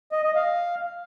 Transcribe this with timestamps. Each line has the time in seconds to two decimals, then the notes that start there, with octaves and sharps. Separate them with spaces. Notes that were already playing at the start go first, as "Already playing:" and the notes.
0.12 D#5
0.24 D#5
0.35 F5